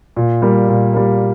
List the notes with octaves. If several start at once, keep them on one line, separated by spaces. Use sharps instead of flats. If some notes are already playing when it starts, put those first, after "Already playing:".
A#2
G3 A#3
A#2
G3 A#3